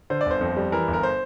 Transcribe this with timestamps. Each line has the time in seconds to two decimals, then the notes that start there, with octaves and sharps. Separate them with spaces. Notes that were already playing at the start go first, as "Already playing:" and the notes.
0.10 D3 C5
0.21 D5
0.26 G1 C5
0.41 F2
0.56 G3
0.72 E3 A#4
0.88 G1
0.93 A#4
1.03 C5